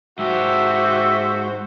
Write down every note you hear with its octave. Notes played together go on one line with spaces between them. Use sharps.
G#2 F#4 G4 C5 E5